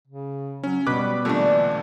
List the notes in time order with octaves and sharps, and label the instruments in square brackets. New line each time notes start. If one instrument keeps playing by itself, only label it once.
[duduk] C#3
[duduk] F#3 [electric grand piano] C#4
[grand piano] B2 [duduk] G3 [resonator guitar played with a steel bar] B4 [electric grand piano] D6 F#6
[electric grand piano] A#2 D3 G3 [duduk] E3 [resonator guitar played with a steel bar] A3 D4